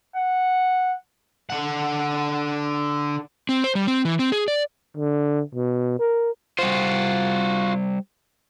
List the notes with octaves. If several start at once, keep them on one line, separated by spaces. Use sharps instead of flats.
F#5
D3 F#5
C4
C5
G3
C4
E3
C4
G#4
D5
D3
B2
A#4
G3 F4 F#4 C5